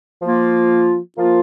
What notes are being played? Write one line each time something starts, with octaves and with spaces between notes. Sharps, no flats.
F3 A#3 F4
F3 A#3 F4